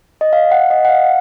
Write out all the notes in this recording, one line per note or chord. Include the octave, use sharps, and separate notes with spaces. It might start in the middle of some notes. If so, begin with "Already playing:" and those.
D#5
F5
F#5
D#5
F#5
F5